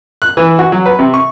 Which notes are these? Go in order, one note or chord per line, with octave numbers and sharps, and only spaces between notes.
F#6
E3
F#4
F#3
B4
C3
C#6